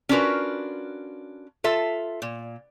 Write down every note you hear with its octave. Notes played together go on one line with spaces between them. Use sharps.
C#4 D4 F4 F#4 A#4 B4
F4 A4 E5
A#2